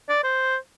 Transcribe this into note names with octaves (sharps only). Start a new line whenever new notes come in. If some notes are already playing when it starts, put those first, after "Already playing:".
D5
C5